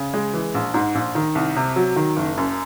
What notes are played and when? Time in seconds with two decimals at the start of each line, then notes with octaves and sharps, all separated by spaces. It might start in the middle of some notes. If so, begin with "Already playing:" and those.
Already playing: C#3
0.14 G#3
0.33 E3
0.55 A#1
0.74 G#2
0.95 A#1
1.15 D#3
1.35 C2
1.56 C3
1.76 F#3
1.96 D#3
2.16 F#1
2.38 F#2